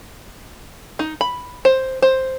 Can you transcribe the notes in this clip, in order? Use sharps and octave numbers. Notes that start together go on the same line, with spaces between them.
D#4
B5
C5
C5